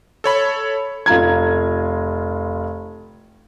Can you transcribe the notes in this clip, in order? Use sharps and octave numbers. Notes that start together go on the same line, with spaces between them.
A4 C#5 B5
F1 F4 A#5 G#6